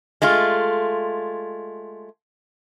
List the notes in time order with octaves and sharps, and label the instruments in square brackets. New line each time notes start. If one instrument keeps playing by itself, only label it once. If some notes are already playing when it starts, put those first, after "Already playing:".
[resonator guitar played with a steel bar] G#3 A3 F4